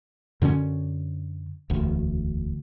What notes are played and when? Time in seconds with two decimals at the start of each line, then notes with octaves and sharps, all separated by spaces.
0.42 F#2 D3 B3 C#4
1.70 E1 D2